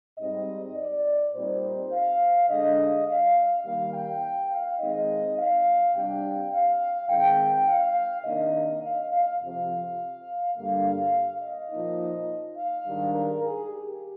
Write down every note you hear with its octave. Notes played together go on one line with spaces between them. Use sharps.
G#2 G3 C4 D#4 D#5
D5
A#2 G3 C4 D#4 C5
F5
D3 G#3 D4 D#5
F5
D#3 G3 A#3 F5
G5
F5
D#3 G#3 C4 D#4 D#5
F5
C3 G3 D4 G5
F5
D#3 G#3 C4 G5
F5
C3 D#3 A#3 D4 D#5
F5
F5
F2 C3 F3 F5
G2 D3 G3 A#3 F5
D#5
A#2 F3 A#3 D#4
F5
G#2 D#3 G3 D4
A#4
G#4
G4